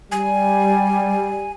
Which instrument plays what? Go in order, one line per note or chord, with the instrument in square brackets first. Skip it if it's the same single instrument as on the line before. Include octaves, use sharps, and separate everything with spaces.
[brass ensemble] G3 [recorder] G#5